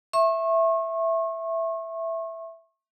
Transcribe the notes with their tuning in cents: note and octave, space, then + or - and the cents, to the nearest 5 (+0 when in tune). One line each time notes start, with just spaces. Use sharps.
E5 +0 C#6 -35